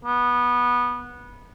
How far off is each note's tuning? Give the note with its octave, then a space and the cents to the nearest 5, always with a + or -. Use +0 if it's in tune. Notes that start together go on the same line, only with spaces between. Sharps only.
B3 -15